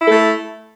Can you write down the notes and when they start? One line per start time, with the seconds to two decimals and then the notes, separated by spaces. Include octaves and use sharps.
0.01 E4
0.05 A4
0.09 A3